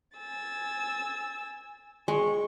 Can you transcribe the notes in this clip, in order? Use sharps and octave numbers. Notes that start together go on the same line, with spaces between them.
G#5 E6 A6
G#3 C#6